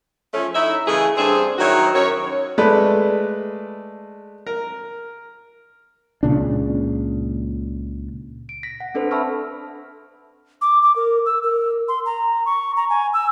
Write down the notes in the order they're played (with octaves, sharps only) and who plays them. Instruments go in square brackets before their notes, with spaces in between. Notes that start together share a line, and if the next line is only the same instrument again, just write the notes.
[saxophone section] F3 A3 C#4
D#4 E4 E5
C#3 E3 A3 G#4
G2 C4 D4 G#4 C5
D#3 F#3 E4 F#4 C#5
F#2 C#5
[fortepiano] G#3 A3 B4 D5
A#4
[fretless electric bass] C#2 A#2 C#3 D4
[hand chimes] D7
A#6 B6
F#5
C4 D4 A4 B4 C5
E5 A5 B5 C#6 E6 F6
[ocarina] D6
D6
A#4
E6
A#4
C6
A#5
C#6
A#5
G#5
E6